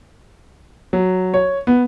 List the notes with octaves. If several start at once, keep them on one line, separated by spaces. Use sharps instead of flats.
F#3
C#5
B3